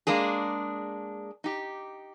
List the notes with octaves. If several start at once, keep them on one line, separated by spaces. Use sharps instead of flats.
G#3 A#3 D4 G#4
D#4 G4